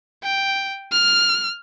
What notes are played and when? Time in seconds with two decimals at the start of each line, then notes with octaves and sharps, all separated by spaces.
0.23 G5
0.92 F6